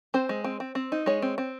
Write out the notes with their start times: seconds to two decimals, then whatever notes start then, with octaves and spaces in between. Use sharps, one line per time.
0.14 C4 C5
0.29 G#3
0.44 C4
0.60 C4
0.75 C4
0.92 D#4
1.06 G#3 C#5
1.22 C4
1.38 C4